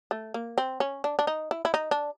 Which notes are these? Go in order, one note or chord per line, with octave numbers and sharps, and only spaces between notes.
A3
A#3
C4
C#4
D4
D4
D#4
E4
E4
D#4
D4